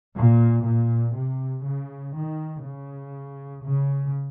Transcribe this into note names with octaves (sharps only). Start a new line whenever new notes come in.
A#2
A#2
C3
C#3
D#3
C#3
C#3